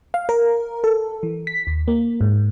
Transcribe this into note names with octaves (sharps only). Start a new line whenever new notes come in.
F5
A#4
A4
E3
B6
D#2
A#3
G#2